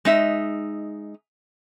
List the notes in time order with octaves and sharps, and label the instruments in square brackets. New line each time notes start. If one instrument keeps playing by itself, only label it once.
[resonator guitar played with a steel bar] G#3 D#4 E5